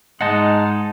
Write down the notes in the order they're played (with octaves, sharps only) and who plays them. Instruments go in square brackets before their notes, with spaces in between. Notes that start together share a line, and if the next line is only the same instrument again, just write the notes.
[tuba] G#2 [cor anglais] G#3 [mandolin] D#4 [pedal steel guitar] F#5 A5